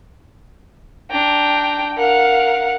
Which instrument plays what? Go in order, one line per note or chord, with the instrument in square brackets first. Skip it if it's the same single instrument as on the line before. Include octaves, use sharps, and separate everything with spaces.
[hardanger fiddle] D4 A#5 [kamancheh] G5
[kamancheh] A#4 F5 [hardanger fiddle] F#5